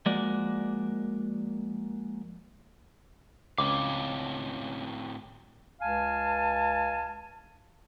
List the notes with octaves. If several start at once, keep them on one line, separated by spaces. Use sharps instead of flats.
F3 G#3 A#3 F#4 D5
C#2 A2 C4 F5 D6
C#2 F5 G#5 A5